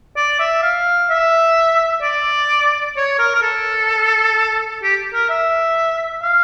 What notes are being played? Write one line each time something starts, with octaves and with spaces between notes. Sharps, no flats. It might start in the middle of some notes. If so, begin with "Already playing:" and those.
D5
E5
F5
E5
D5
C#5
A#4
A#4
A4
G4
A#4
E5
F5